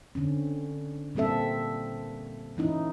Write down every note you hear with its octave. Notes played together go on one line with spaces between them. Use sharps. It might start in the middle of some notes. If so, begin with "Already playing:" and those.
D3 C4 C#4
A#2 G3 A#3 C4 A4 E5
E3 C#4 D#4 E4